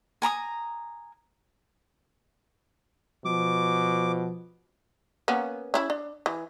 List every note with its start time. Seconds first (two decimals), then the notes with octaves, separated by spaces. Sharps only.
0.22 G#5 A#5 B5 D#6
3.25 B2 F3 D6
5.28 A#3 B3 C#4
5.74 C#4 E4 B5
5.90 D4
6.26 E3